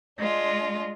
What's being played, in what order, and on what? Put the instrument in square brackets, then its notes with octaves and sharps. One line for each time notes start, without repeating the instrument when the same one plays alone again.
[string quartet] G#3 D4 F4